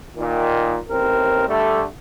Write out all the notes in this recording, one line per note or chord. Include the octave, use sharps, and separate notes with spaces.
A#2 D#3
A1 D#2 C4 A#4
D3 G3 A3